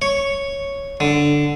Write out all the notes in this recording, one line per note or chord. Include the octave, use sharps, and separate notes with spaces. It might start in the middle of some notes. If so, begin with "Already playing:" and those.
C#5
D3